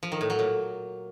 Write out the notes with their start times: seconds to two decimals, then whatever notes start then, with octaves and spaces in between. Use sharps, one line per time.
0.03 F3
0.12 D#3
0.21 A2
0.30 F#3
0.39 A#2